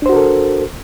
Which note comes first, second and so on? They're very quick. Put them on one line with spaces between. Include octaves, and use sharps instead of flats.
D4 C5 F#4 A#4 A4